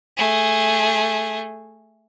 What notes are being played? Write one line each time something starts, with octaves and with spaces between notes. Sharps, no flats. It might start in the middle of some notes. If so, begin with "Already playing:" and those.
A3 G#4